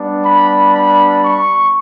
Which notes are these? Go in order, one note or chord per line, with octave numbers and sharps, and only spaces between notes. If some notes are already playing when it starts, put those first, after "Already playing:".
Already playing: G3 B3 D4
B5
B5
C#6